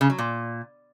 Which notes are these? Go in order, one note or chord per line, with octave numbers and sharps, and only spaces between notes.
C#3
F#3
A#2